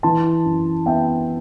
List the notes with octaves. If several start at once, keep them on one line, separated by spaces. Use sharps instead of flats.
E3 A5 C6
F#2
B3 E5 G5